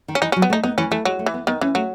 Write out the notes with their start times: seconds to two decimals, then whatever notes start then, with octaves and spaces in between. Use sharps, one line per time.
0.08 D#3
0.15 C#4
0.22 E3 D#4
0.32 F#3 C#4
0.42 B3
0.50 A3
0.53 D#4
0.64 B3 D#4
0.78 E3 C#4
0.91 E3 A3
1.05 F#3 G#3
1.19 A3
1.26 E3
1.34 B3
1.47 D#3 B3
1.61 E3 C#4
1.75 F#3 A3